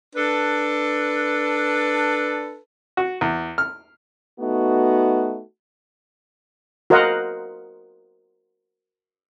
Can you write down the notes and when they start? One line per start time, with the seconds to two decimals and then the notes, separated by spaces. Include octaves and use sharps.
0.16 D4 A4 B4
2.97 F#4
3.21 E2
3.58 F6
4.40 A3 B3 D#4 F#4
6.90 F#4 A#4 C5 D#5 F5 F#5